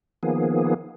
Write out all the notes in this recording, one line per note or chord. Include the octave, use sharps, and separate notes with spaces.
D#3 F3 A#3 B3 G#4